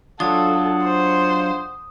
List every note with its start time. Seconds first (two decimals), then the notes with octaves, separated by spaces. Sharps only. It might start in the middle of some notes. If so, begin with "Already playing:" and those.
0.20 F#3 D4 F4 A4 F#5 D#6
0.85 C5